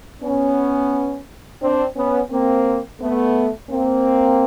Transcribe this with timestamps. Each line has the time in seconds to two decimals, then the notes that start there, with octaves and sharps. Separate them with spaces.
0.22 B3 C#4
1.61 C4 D4
1.96 B3 C#4
2.31 A#3 C4
3.01 A3 B3
3.70 A#3 C4